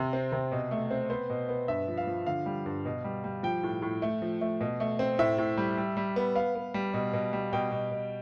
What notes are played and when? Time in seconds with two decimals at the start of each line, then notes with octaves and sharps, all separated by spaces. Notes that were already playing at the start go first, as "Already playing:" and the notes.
Already playing: C3
0.13 C4
0.32 C3
0.52 B2
0.71 A3
0.91 C4
1.10 B3 C5
1.30 B2
1.49 B3
1.68 G2 E5
1.88 F3
1.97 F5
2.07 F3
2.27 D3 F5
2.46 G3
2.66 G2
2.85 B2
3.04 G3
3.24 G3
3.43 F3 G5
3.63 A2
3.82 A2
4.02 A3
4.22 F3
4.41 A3
4.61 B2
4.80 A3
4.99 C4
5.19 A2 E5
5.38 A2
5.57 G3
5.77 G3
5.97 G3
6.16 B3
6.35 B3 F5
6.55 B3
6.74 G3
6.94 B2
7.13 B2
7.33 G3
7.53 B2 G5
7.72 B2
7.91 B2